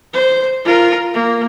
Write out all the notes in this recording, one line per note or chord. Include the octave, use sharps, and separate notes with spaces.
C5
F4 A#4
A#3